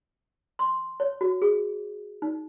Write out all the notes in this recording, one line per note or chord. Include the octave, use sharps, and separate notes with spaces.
C6
C#5
F#4
G#4
D#4